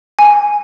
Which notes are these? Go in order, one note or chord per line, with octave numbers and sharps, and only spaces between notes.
G#5